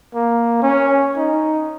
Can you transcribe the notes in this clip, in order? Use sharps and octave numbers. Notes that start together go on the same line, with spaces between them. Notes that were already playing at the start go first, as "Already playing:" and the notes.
A#3
C#4
D#4